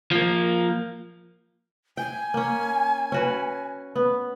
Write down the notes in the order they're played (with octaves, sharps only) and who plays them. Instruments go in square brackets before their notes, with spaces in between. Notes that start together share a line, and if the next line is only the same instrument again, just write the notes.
[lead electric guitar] F3 A#3
[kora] G5 [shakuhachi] G#5
[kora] A#3 C#4
C#4 F#4 B4
B3